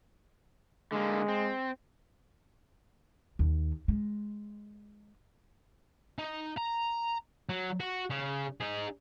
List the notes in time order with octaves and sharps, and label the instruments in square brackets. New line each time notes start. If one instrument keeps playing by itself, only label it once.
[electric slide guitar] D3 A#3 [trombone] G#3
[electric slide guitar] C4
[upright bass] D#2
G#3
[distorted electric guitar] D#4
A#5
F#3
F#4
C#3
D#4 G#4